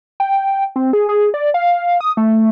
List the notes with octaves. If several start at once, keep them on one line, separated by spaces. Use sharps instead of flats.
G5
C4
G#4
G#4
D5
F5
D#6
A3